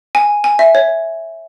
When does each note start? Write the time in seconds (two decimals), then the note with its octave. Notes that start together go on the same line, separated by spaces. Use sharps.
0.15 G#5
0.44 G#5
0.59 E5
0.75 C#5